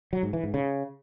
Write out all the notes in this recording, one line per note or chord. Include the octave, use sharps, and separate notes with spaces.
F#3
G#2
E3
G#2
C#3